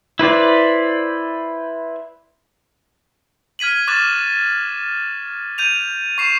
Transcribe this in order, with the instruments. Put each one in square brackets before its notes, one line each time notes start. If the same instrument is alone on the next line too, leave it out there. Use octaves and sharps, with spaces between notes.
[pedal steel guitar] E4 B4 C5 D5
[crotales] F6 G#6 B6 D#7 F#7
C#6 D6 F#6 A6 E7
G6 D#7 F7
C#6 C7 E7